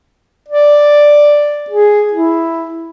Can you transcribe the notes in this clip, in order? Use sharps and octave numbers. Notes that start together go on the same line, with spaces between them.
D5
G#4
E4